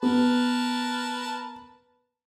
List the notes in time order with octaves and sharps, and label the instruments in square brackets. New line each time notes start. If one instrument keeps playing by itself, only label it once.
[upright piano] B3 [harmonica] A#4 B4 A5